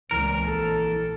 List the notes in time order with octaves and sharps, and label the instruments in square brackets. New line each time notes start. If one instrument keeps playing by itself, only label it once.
[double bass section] C#2 G#3 C4 [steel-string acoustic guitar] A#2 E3 [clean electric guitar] A#4
[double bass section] A#1 [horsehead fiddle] A4